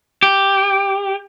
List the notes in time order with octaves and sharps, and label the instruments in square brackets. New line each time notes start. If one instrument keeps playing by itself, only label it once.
[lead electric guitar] G4